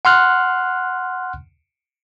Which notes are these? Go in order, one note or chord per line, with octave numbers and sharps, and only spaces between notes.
F#5 C6 F6 F#6